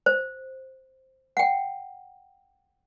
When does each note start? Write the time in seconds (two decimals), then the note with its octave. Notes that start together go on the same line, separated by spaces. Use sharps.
0.06 C5
1.37 F#5 G5